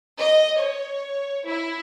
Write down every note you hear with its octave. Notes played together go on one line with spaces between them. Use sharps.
D#5
C#5
E4